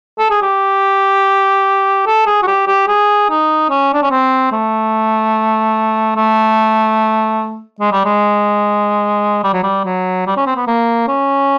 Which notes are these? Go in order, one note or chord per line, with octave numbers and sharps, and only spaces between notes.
A4
G#4
G4
A4
G#4
F#4
G4
G4
G#4
D#4
C#4
D4
C#4
C4
A3
A3
G#3
G3
G#3
G3
F#3
G3
F#3
G3
C#4
C4
B3
A#3
C#4